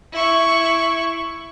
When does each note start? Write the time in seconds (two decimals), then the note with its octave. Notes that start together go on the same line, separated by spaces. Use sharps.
0.13 E4 C#6